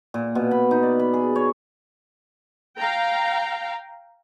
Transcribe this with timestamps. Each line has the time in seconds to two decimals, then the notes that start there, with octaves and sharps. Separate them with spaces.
0.14 A#2
0.35 B2
0.51 B5
0.71 D#4
0.83 D5
0.99 B5
1.14 G#4
1.36 C#5
2.79 F5 G5 A#5